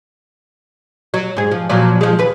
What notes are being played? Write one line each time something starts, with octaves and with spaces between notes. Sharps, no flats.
F#3
G#2 G#4
F3
A#2 F3 F#3
F3 G#3
D#2 B4